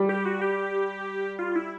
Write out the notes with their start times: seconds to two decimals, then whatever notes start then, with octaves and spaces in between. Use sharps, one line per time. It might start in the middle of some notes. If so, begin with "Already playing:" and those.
Already playing: G3
0.09 G4
0.25 F#4
0.42 G4
1.39 F4
1.55 E4